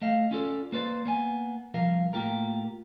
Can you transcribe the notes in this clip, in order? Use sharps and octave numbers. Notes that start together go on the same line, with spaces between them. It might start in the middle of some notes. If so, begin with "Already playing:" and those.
A3 D#5 F5
C#4 F4 A4 D5
A#3 B4 C5 D5
A#3 B3 G#5
C2 F3 A#4 F5
A2 A#3 F4 G4 A#4